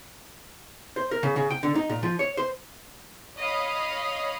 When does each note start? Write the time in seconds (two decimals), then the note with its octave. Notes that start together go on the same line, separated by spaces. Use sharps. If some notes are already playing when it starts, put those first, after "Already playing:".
0.96 C5
1.11 A#4
1.23 C#3
1.36 C#3
1.51 G5
1.63 D3
1.75 D#4
1.89 A#2
2.03 F3
2.19 C#5
2.37 C5
3.37 C#5 D#5 F5 B5